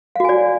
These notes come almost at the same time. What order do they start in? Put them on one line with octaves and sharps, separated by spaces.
F5 F#4 G#5 D5